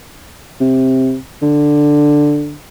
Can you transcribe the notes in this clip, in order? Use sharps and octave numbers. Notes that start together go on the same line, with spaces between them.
C3
D3